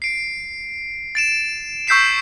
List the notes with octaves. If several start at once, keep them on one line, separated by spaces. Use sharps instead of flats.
C7 D7
A6 D7 E7
C#6 E6 G6 B6 C7 E7